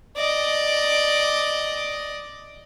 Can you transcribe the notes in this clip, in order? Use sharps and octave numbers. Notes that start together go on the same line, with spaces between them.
D5 D#5